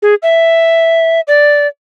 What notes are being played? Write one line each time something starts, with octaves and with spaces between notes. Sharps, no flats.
G#4
E5
D5